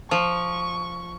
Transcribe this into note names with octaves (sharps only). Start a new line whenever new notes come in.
F3 C#6